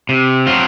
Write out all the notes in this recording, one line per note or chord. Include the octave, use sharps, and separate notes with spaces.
C3
F#3 C4 F4